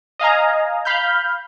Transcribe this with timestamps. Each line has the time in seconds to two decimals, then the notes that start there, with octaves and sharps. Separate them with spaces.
0.19 D#5 F5 G#5 A#5
0.85 F5 B5 F6 G6